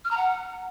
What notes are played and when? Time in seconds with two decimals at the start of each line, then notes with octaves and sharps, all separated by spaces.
0.04 F6
0.11 A#5
0.17 F#5